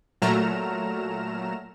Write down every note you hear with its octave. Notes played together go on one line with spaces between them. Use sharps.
A#2 F#3 A3 A#5 F6 E7